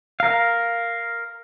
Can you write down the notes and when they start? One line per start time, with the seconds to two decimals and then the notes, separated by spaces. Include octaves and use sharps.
0.20 A#4 F5